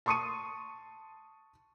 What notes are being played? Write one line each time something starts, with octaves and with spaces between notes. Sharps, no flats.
A5 C6 C#6 D#6 C#7 D#7